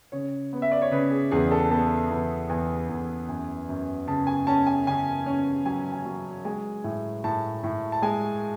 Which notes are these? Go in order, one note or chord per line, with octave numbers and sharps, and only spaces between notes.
C#3 C#5
B3
E5
D5
C#5
C#3 B4
G#4
E2 G#4
A4
B3 A4
E2
E2 G#5
E2
F#2 G#5
F#2
C#3 A5
G#5
C#4 A5
G#5
C#3 G#5
C#4
F#3 G#5
G#5
F#3
G#3 G#5
A2
A2 A5
A2
A5
G#3 G#5